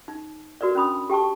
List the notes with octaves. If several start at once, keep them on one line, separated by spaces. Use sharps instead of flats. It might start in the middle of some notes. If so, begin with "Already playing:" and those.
D#4
F#4 A#4 B4 D5
C#4 D4 B5 D#6
G4 G5 A5 C#6